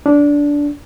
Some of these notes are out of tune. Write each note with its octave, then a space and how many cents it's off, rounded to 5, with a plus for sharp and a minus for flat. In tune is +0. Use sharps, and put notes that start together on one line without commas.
D4 -15